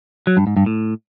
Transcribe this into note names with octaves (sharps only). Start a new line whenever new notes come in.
F#3
G2
G#2
G2
A2